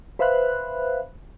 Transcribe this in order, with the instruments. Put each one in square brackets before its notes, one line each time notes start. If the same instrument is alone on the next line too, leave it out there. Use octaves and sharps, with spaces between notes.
[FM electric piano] B4 C5 E5 F5 B5 F#6